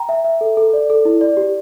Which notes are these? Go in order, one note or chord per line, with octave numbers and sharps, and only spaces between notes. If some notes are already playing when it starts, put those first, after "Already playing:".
Already playing: G5 A#5
E5
E5
A4
A4
D5
A4
E4
D5
G4